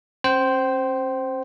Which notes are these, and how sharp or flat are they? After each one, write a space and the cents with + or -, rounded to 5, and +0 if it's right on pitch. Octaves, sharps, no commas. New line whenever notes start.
C#4 -40 C5 +0 G5 -30